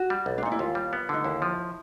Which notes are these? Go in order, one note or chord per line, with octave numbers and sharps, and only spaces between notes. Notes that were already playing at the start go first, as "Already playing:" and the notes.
Already playing: F#4
G3
B1
D4
A#2 D#4
E4
D#2 F4
G3
B3
D3 D#4
D#2 E4
F3